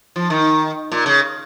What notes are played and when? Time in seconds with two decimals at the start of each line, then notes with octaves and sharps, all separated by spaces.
0.16 F3
0.30 D#3
0.92 A#2
1.06 C#3